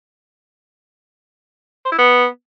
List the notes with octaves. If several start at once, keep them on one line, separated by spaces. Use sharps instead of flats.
C5
E4
B3